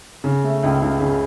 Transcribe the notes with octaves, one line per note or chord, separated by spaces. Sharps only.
C#3
A3
C#2
C#2
C#3